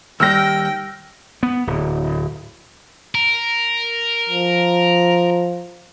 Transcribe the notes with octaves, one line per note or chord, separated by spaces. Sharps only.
D#2 G3 G5 E6 F6 A#6
B3
D1
A#4
F3